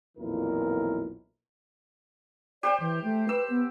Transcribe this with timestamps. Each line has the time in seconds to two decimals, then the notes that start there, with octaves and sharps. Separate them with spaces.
0.18 B1 F2 A#2 E3 E4 A#4
2.63 G4 C5 D5 G5
2.80 E3
3.04 A3
3.29 B4 E6
3.50 B3